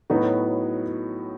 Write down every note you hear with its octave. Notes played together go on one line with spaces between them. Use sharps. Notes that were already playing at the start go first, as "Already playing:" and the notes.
A2 F#3 B3 D#4 F#4